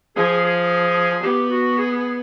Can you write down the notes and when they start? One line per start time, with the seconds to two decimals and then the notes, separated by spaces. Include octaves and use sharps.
0.16 F3 G#4
0.44 G#4
1.24 B3 G4
1.51 F#4
1.78 G#4
1.95 G#4